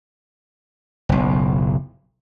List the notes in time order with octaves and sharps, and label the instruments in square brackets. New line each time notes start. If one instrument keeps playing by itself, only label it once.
[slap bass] F#1 B1